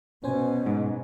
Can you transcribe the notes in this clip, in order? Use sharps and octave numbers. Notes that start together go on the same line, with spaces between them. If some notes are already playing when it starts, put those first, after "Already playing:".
B2 C#4 C5 G#5
G#2